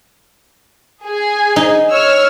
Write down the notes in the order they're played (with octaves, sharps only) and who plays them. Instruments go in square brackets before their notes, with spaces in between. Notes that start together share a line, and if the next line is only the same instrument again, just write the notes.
[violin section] G#4 G#5
[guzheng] D#4
[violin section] C#5 E6 F6